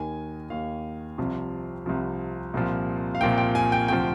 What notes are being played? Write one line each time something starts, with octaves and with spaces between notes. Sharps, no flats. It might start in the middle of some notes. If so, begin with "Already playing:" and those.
Already playing: D#2 D#3 G#5
D#2 D#3 F5
C2 C3 F3
C2 C3 F3
C2 A#2 F3
F5
C2 A#2 F3 G5
G5
G#5
G5
D2 C3 F3 G5